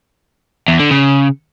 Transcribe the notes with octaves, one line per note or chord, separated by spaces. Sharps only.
E2
D3
C#3